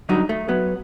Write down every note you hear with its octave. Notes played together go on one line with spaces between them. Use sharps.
D3 F#3 G3 D#4
A3
F#3 B3